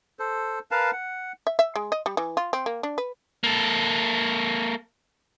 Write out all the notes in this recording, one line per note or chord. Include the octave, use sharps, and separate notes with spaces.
A4 C5
A#4 B4 F5 A5
F#5
E5
E5
G#3
D#5
G3
E3
F4
C4
A#3
D4
B4
A#3 A4